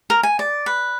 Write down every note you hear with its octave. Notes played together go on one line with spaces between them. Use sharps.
A#4
G#5
D5
B4